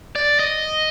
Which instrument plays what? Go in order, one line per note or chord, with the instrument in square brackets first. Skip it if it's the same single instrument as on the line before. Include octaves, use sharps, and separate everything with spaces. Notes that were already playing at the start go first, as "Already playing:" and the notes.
[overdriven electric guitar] D5
D#5